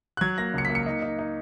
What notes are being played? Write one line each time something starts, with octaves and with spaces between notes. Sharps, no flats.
F#6
F#3 G#6
A#3 A#6
C#2 C#7
B6
A#3
C#7
D#4
D#4
D#4